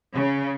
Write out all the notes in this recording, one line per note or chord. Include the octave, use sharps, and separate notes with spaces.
C#3